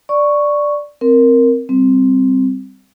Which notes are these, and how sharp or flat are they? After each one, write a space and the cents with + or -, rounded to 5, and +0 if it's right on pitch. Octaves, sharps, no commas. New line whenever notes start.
D5 +0 C#6 +0
C4 +0 A#4 +0
G3 +0 C4 +0